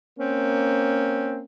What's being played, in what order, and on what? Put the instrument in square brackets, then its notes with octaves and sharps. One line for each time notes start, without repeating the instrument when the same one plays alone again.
[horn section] A#3 C4 C#4